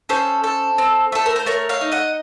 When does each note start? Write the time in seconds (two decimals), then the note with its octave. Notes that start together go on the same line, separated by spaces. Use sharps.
0.09 C#4 A4 C5
0.44 A4
0.78 C4
1.12 A3 A4
1.26 A#4
1.36 C5
1.46 A3 A#4 C#5
1.69 C#5 F5
1.81 D#4
1.92 D#5 F#5